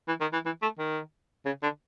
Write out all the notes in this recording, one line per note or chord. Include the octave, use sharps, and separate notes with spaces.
E3
D#3
E3
E3
A3
D#3
C#3
D3